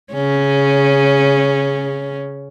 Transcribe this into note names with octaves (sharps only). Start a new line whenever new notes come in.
C#3 C#4